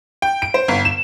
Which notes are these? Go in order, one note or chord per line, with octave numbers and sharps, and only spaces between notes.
G5
D7
C5
G1
E7